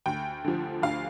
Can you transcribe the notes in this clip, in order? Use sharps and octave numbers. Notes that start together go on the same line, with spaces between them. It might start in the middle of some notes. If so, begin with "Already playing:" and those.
D2 G5
D3 F3
D2 F5